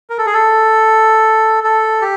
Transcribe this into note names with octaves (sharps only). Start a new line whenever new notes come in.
A#4
A4
G#4
A4
A4
G4